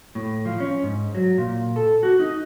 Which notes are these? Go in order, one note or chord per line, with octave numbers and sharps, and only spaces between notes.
A2
F3
C#4
G#2
F#3
A#2
A4
F#4
D#4